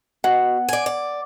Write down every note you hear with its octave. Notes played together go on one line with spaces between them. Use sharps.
B2 F#5
D5 G#5
D5